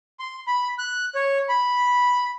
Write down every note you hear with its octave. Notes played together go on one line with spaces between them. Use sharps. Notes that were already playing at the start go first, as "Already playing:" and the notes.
C6
B5
F#6
C#5
B5